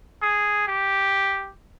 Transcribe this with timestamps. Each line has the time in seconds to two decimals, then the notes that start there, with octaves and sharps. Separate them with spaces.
0.22 G#4
0.67 G4